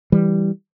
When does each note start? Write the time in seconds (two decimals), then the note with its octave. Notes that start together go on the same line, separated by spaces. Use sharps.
0.12 E3 G3